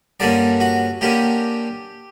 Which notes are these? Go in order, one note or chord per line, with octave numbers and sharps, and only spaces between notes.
G2 D3 A#3 C#4 D5
F#4
D3 A#3 C#4 G4